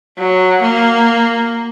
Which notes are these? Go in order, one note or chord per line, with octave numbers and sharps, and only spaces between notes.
F#3
A#3